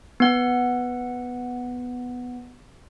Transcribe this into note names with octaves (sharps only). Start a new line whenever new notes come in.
B3 F#5